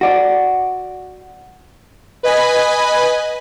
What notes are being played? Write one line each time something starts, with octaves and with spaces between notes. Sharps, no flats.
F#4 D5
B4 D#5 G#5 B5